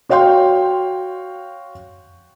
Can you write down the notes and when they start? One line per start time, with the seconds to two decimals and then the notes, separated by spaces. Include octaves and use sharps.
0.09 F#4 C#5 F5 G5 C6